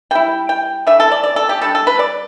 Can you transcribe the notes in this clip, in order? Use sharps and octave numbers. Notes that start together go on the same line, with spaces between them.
G3 E4 G5
G5
E3 A3 D4 E5
A4
D5
D5
A4
G4
G3 D4 A4
A4
B4
D5